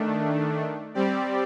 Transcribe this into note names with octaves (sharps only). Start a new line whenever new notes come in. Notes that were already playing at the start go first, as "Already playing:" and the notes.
Already playing: D#3 A3 D4
G3 C4 G4 D5